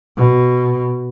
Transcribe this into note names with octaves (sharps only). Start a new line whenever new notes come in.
B2